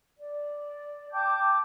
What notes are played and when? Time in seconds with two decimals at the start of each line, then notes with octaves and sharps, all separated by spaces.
0.18 D5
1.11 G5 A5 D6 G6